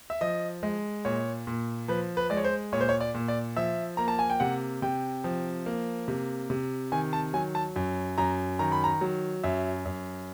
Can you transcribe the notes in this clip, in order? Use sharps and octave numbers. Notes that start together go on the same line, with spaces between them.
E5
F3 D#5
G#3
A#2 C#5
A#2
F3 B4
B4
G#3 D5
C#5
C5
A#2 C#5
C5
C#5
D5
A#2
D5
F3 E5
A#3 A#5
A5
G#5
G5
C3 F#5
C3 G5
F3
A#3
C3
C3
D#3 G#5
A5
F#3 G#5
A5
F#2
F#2 A#5
D#3 A#5
B5
A#5
F#3
F#2 E5
F#2